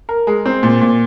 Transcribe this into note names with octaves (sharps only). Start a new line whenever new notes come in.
A#4
G#3
C4
A#2
A#2